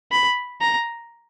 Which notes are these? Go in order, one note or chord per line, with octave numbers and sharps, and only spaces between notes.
B5
A#5